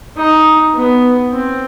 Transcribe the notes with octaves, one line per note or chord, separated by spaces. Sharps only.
D#4
B3
C4